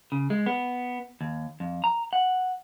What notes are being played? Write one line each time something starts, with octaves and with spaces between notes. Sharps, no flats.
C#3
G#3
B3
D#2
F2
A#5
F#5